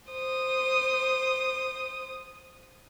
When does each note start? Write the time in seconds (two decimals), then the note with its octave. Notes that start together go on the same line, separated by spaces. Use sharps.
0.10 C5 D#6